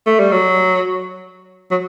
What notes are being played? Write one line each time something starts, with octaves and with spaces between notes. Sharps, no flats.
A3
G3
F#3
F#3